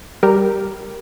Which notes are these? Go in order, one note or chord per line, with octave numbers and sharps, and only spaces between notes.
G3 G4 A#4